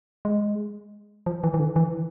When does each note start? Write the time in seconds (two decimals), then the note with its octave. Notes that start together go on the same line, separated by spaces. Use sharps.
0.25 G#3
1.26 F3
1.44 E3
1.54 E3
1.59 D3
1.76 E3